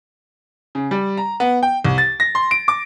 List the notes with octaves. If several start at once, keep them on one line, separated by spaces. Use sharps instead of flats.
C#3
G3
A#5
B3
G5
C2
A6
A#6
C6
D7
D6